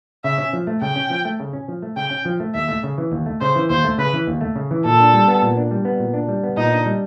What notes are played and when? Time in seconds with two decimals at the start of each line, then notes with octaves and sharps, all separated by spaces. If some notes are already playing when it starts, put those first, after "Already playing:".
0.24 C#3 E5
0.38 C#4
0.53 F3
0.67 A3
0.82 C#3 G5
0.96 C#4
1.10 F3
1.25 A3
1.40 C#3
1.53 C#4
1.69 F3
1.82 A3
1.96 C#3 G5
2.11 C#4
2.25 F3
2.40 A3
2.54 D#2 E5
2.69 A3
2.83 C#3
2.98 E3
3.12 D#2
3.26 A3
3.41 C#3 C5
3.56 E3
3.70 D#2 C5
3.84 A3
3.98 C#3 B4
4.13 E3
4.27 D#2
4.41 A3
4.56 C#3
4.71 E3
4.85 A#2 A4
5.00 D4
5.13 G3
5.28 B3
5.42 A#2
5.57 D4
5.71 G3
5.85 B3
5.99 A#2
6.14 D4
6.28 G3
6.43 B3
6.57 A#2 D#4
6.72 D4
6.86 G3